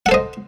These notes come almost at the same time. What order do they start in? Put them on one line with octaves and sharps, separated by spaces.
F#5 A4 C5 D#5